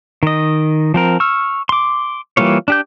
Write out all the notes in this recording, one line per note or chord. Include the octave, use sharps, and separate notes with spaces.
D#3 D#5
F3 C4 A#4
C#6 E6 F6
C6 D6
E3 G3 A#3 F4 C#5
D4 G4 G6